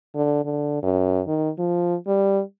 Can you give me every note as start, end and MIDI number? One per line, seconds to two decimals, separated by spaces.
0.15 0.44 50
0.45 0.83 50
0.83 1.21 42
1.27 1.50 51
1.58 1.95 53
2.07 2.41 55